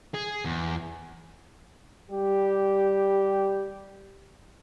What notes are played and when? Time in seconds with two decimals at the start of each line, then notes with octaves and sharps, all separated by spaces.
0.14 G#4
0.45 E2
2.11 G3 G4